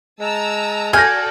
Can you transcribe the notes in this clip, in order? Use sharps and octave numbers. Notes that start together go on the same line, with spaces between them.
G#3 A5 A#5 E6
F#4 A4 D5 G#5 F6 G6 A#6